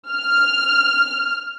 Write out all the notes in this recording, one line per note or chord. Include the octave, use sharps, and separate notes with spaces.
F6